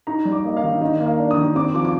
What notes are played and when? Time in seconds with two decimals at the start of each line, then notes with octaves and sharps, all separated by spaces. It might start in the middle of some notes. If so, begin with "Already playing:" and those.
0.07 D#4 A#5
0.25 G3
0.32 D6
0.44 A#3 D#5
0.57 F5
0.63 D#3
0.81 D#3 D#5
1.00 A#3
1.06 F5
1.19 D4
1.31 D#6
1.37 D#3
1.55 C4 D6
1.74 F3 D6
1.85 D6